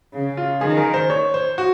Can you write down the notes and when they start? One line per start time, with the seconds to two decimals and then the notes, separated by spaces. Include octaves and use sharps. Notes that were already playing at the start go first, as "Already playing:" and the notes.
0.14 C#3
0.37 F4
0.61 D#3 G#4
0.77 A#4
0.94 C5
1.10 C#5
1.34 C5
1.58 F#4